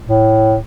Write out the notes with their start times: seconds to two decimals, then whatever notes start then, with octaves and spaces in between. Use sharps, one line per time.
0.08 A2